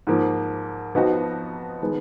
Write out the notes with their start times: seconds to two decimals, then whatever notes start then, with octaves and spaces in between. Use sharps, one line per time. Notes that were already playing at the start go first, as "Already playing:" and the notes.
0.07 G#2 F3 A#3
0.94 F2 F3 B3 D#4 F#4
1.82 D#3 G#3 B3